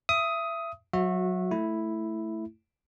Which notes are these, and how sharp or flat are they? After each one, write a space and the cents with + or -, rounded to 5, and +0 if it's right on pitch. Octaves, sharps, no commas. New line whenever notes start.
E5 +25 D#6 +15
F#3 -5 F#4 -25 E5 +0
A3 +0 E4 +0